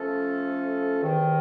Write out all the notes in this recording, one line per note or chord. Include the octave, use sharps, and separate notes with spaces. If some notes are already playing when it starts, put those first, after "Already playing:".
Already playing: F3 A3 C#4 F4 A4
E2 C3 D#3